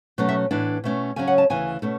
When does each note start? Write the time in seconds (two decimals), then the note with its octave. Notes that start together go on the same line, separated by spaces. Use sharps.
0.18 B2 F#3 A3 C#4
0.29 E5
0.51 A2 E3 B3 D4
0.84 B2 A3 C#4
1.16 C#3 F#3 C#4 G#5
1.27 F#5
1.38 A5
1.50 D2 C#3 E3 G#5
1.82 B2 A3 C#4